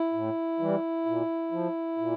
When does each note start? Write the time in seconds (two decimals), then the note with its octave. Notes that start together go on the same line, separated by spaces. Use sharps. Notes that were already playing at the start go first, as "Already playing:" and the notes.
Already playing: E4
0.13 A2
0.60 E3 G3
1.06 A#2
1.52 F3
1.98 A#2